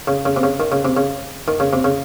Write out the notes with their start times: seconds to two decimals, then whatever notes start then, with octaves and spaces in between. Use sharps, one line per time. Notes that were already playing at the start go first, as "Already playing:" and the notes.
0.07 C#3
0.25 C#3
0.36 C3
0.43 C#3
0.60 D#3
0.72 C#3
0.85 C3
0.97 C#3
1.48 D#3
1.60 C#3
1.73 C3
1.84 C#3